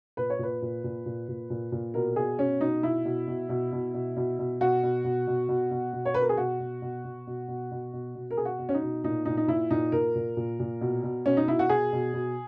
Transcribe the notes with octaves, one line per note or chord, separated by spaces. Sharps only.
A#2 B4
C#5
A#2 B4
A#2
A#2
A#2
A#2
A#2
A#2
B2 A#4
B2 G#4
B2 C#4
B2 D#4
B2 E4
B2
B2
B2
B2
B2
B2
B2
B2 F#4
B2
B2
B2
B2
B2
B2
C#5
B2 B4
A#4
G#4
B2 F#4
B2
B2
B2
B2
B2
B2
B2
B2
A#4
B2 G#4
F#4
B2
C#4
D#4
B2
A#2 D#4
A#2 D#4
D#4
A#2 E4
A#2 D#4
A#2 A#4
A#2
A#2
A#2
B2
B2
B2 C#4
D#4
B2 E4
F#4
B2 G#4
B2
B2